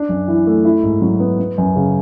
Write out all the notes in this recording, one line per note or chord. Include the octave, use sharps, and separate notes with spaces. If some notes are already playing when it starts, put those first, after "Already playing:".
Already playing: D4
F#2
E3
A3
E4
G#2
F#3
B3
B3
F#2
C#3